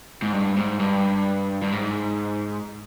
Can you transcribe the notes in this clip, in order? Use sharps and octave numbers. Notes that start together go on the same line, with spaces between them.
G#2
G2
G#2
G2
G2
G#2